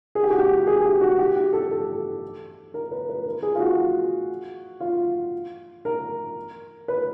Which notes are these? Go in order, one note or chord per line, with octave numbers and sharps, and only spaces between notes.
G#4
G4
F#4
G4
G#4
G4
F#4
G4
G4
A4
A4
A#4
B4
B4
A#4
G#4
F4
F#4
F4
A#4
B4